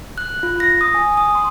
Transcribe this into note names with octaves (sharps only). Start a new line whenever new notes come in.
F#6
F4
A#6
D#6
G#5
D#6
C6